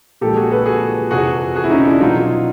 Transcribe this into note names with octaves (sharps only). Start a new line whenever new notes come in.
A#2 F3 G#3 G4 A4
F#4 G#4
A4 B4
F#4 G#4
F2 C3 E3 F#4 G#4
F#4 G#4
E4
C#4 D#4
D4 E4
B2 F#3 D#4 F4